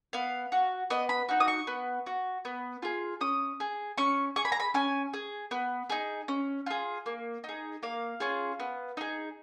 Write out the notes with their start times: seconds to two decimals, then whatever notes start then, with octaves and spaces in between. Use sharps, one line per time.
0.13 B3 F5
0.52 F#4
0.90 B3 D#5
1.09 B5
1.29 D#4 F#4
1.40 D#6
1.48 C#6
1.67 B3
2.06 F#4
2.45 B3
2.82 F4 G#4
3.21 C#4 D#6
3.60 G#4
3.98 C#4 C#6
4.36 G#4 C#6
4.45 B5
4.52 A#5
4.60 B5
4.74 C#4 G#5
5.13 G#4
5.51 B3
5.90 D#4 G#4
6.28 C#4
6.66 F4 G#4
7.06 A#3
7.44 D#4 G#4
7.83 A#3 F5
8.20 C#4 F4 G#4
8.60 B3
8.97 D#4 G#4